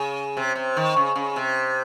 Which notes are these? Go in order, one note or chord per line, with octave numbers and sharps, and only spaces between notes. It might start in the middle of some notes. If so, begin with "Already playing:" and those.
Already playing: C#3
C3
C3
D#3
C#3
C#3
C3